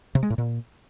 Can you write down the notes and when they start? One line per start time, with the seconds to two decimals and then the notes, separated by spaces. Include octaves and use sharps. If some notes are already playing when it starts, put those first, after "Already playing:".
0.15 C3
0.23 G#3
0.30 A2
0.38 A#2